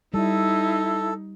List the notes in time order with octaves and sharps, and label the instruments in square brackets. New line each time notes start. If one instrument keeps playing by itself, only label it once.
[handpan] G3 [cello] D#4 [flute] E4 [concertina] A4